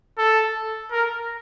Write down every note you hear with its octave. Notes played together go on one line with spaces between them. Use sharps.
A4
A#4